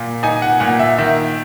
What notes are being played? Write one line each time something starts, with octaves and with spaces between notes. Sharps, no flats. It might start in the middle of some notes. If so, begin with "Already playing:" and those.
Already playing: A#2 A#3
D#4 G#5
F#5
A#2 F#5
E5
D#3 E5